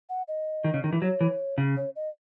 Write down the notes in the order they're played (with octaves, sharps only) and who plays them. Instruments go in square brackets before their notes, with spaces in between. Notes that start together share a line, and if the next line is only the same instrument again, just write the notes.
[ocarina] F#5
D#5
[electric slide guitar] D#3
C#3
D#3
E3
[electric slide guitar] F#3 [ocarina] C#5
[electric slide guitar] E3
C#3
[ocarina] C#5
D#5